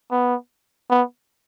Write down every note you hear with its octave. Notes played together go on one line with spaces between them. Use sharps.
B3
B3